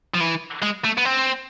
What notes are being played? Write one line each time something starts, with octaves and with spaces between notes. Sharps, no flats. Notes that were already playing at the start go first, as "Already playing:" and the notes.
F3
E3
G#3
A3
B3
C4